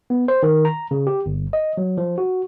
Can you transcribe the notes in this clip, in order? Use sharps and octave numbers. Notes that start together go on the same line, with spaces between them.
B3
C5
D#3
A#5
C#3
G4
G1
D#5
F#3
F3
F#4